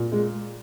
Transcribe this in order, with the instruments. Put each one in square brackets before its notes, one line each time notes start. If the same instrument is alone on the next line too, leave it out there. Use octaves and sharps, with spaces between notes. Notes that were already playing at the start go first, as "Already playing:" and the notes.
Already playing: [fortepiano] A#2
[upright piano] G#3